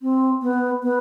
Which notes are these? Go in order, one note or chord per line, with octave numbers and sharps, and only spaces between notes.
C4
B3
B3